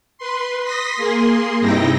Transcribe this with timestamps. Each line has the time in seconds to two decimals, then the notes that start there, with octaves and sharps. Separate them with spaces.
0.18 B4 C6
0.63 C6 D#6 A#6 B6
0.96 A#3 G#4 C6
1.60 G2 C3 D#4 E4 G5 A#6